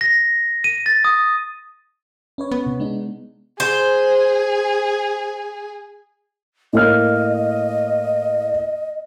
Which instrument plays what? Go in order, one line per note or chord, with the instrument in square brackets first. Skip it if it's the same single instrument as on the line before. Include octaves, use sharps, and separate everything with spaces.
[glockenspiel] A#6
D#7
A6
D#6
[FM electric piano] C#4 B4 C#5
[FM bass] B3
[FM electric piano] C3
G#3 D4 D#4
[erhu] G#4 [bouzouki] C5
[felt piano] A2 A#3 F6 [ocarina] D#5